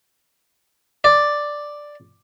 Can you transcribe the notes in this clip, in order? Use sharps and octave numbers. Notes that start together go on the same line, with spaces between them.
D5